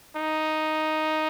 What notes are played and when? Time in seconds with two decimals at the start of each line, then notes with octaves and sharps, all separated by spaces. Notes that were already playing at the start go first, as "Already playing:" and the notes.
0.16 D#4